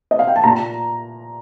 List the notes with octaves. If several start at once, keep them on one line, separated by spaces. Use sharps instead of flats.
D#5
F5
G5
A5
A#2 A#5